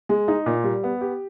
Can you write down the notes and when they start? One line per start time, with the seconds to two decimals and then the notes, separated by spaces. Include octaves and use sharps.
0.09 G#3
0.28 D#4
0.46 A#2
0.64 G3
0.84 B3
1.01 G4